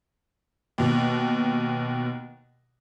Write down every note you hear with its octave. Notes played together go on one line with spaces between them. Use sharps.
D#2 B2